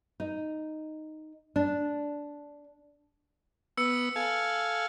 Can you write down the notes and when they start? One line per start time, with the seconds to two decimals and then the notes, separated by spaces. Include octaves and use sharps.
0.20 D#4
1.56 D4
3.77 B3 E6 C#7
4.16 A4 F5 G#5